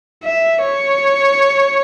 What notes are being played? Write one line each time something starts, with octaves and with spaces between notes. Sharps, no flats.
E5
C#5